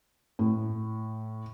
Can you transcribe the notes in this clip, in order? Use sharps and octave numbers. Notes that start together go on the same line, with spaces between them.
A2